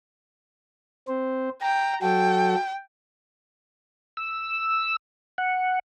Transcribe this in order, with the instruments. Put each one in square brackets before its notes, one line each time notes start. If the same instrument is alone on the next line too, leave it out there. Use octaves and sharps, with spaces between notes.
[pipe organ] C4 C5
[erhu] G5 [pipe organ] A#5
[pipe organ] F#3 F#4 A4 [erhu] G5
[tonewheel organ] E6
F#5